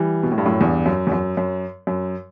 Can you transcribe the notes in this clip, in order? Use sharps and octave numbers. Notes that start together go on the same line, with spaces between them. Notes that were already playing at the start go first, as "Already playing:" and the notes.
Already playing: E3 G3
B2
A2
G2
F#2 A2
E2 G2
F#2
E2
F#2
F#2
F#2